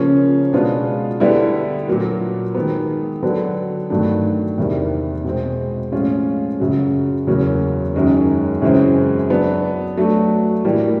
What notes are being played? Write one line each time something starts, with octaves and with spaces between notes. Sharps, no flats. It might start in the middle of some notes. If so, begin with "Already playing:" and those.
Already playing: C#3 F3 A#3 C#4
B2 G#3 B3 D4 F4
D3 G3 B3 E4
A#2 F#3 A#3
D#3 G#3 B3
D3 F#3 B3 D4
G2 D#3 F#3 A3 D4
E2 C3 D#3 G3 A#3
B2 G#3 C4
A2 F3 G#3 C#4 F4
F#2 C#3 F#3
E2 C#3 F#3 A#3 C#4
F#2 D#3 G#3 C#4
F#2 C#3 E3 G#3 C4
F#3 B3 D4
F#3 A3 D4
A2 E3 G3 A#3